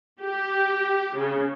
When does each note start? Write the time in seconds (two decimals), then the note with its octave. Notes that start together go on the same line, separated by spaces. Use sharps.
0.21 G4
1.16 C#3